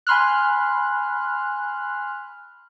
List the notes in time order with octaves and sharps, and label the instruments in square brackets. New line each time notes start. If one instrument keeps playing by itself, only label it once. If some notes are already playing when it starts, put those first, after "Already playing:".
[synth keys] G#5 B5 C6 F6 F#6